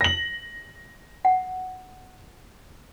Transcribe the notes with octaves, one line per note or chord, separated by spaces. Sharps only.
A#6 F#7
F#5